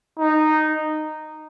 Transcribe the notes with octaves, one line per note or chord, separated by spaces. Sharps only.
D#4